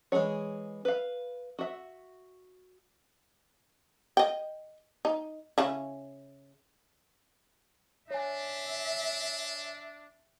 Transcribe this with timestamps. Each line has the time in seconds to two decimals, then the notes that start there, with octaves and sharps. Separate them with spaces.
0.12 E3 G#3 F#4 G#4 C#5
0.85 B4 F5
1.59 F#4 E5
4.17 D#5 G5
5.05 D#4
5.58 C#3 C#4 E4
8.11 D4 C#5 E5 G#5